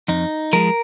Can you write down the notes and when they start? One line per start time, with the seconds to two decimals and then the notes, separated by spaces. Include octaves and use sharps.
0.08 F2 D#4
0.53 F3 G#3 A#4